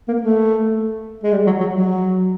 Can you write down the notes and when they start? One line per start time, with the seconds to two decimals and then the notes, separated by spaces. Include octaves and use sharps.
0.08 A#3
0.22 A3
1.23 G#3
1.32 G3
1.46 F#3
1.60 F#3
1.74 F#3